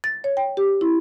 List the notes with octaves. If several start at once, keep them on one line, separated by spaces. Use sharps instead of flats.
A6
C#5
G5
G4
E4